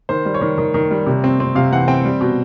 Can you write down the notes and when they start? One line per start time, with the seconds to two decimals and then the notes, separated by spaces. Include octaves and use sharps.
0.09 D#3 C5
0.26 G3
0.34 C#5
0.41 D#3
0.58 D#3
0.74 D#3
0.91 G3
1.06 C3
1.24 C4
1.40 C4
1.55 C3 F5
1.72 E3 F#5
1.88 C4 G5
2.05 G3
2.21 B2